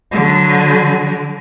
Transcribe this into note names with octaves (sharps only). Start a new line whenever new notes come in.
D3 F#3